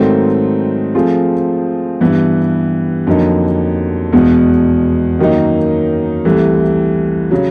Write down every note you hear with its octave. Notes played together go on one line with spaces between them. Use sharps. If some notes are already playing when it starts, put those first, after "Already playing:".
Already playing: G#2 D#3 F#3 A3 C4
F3 A3 C4 F4 G#4
G2 E3 G3 B3
F2 D3 F#3 A#3 D#4
E2 B2 G#3 B3
F#2 D#3 F#3 A#3 D#4
C2 C3 E3 A3
C#3 F#3